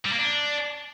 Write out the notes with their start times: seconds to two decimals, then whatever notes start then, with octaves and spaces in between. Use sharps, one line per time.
0.05 G3
0.12 A#3
0.19 D4